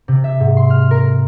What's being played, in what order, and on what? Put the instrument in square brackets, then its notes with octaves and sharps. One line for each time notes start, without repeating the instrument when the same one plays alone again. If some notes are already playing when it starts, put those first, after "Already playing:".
[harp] C3
E5
G#2
C6
F6
A#4